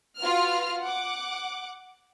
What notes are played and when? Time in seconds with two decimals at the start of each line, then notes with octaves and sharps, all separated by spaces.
0.19 F4 F#4 B4 F6
0.81 F#5 D6